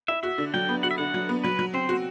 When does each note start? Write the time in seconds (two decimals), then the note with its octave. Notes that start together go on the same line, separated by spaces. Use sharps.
0.08 E4 E5
0.23 F#4 E5
0.38 D3
0.54 F#3 G5
0.69 B3
0.83 F#4 F#5
0.91 E5
0.98 D3 F#5
1.14 F#3
1.29 B3
1.44 F#3 B4
1.59 F#3
1.74 C4 C5
1.89 F#4